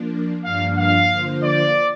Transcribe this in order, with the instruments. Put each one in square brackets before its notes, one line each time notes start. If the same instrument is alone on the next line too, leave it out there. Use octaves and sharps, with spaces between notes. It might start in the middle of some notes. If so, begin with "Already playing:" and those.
Already playing: [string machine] F3 A#3 D4
[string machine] G2 F3 A#3 D4 [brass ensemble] F5
[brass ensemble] F5
[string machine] D3 F3 A#3 F4 C5
[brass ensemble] D5